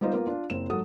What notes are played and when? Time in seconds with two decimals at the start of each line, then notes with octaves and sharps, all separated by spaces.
0.01 G3 B3 D#4 F4 C5 D#5
0.13 A#3 B3 F4 A#4
0.27 D4 F4
0.50 F#1 C4 E7
0.70 G#2 F#3 A4 F#5 D#6